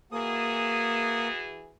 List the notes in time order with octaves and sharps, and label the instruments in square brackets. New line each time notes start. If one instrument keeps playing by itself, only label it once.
[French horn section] E3 F#4 G#4 [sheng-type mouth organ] A#3 D#6